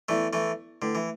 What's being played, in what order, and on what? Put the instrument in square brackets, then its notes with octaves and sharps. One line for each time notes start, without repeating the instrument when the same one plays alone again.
[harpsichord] E3 A3 [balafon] B3 E4 D5
[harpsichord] E3 A3
[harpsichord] D3 [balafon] A3 E4 B4
[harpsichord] E3